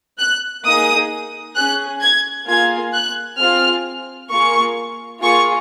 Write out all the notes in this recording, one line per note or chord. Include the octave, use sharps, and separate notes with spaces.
F#6
A#3 D#4 G#4 D#6
C#4 G#4 F#6
G#6
A#3 F4 G#4 G#6
F#6
C4 F4 G#4 F6
A#3 F4 G#4 C#6
A#3 F4 G#4 C#6